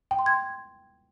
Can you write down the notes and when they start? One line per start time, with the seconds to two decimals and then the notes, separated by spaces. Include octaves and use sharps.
0.11 G5
0.19 C6
0.26 G#6